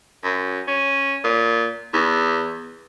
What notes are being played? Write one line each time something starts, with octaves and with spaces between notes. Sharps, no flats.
F#2
C#4
A#2
E2